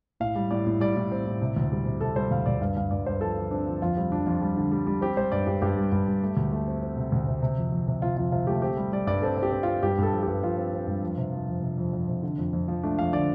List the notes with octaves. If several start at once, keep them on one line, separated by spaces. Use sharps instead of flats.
A2 F5
G3
A2 D5
A2
G3 D5
A2
C4
A2
C3
D2
G3
C3
C3 A4
G3 C5
D2 F5
D2 D5
G2 F5
G2 F5
G2 D5
G2 C5
F3 A4
F3
C4 D4
F3
F2 F4
G3 C4
F2 D4
F2 F4
G3
D3
G3
G3
C4 G4
G3 C5
G2 D5
G2 G4
G2 G4
G3
G2
G3
A3
D2
A3
C4
C4
C3
D2
C3
C3
F2
F2
C3
C3 F4
F2 F4
C3 F4
A3 G4
C4 G4
G3
G3 D5
G2 D5
C4 A4
C4
G4
C4
C4 F4
G2 G4
G2 A4
F3
G2 G4
F3 F4
C4
C4
G2
F2
C3
F3
F2
C3
F2
F2
C3
D3
F2
F2
F3
A3 D4
F2 F5
D3 D5